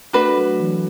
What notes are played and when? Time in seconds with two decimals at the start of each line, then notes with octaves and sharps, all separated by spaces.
0.13 A3 D4 F#4 B4
0.37 F#3
0.60 E3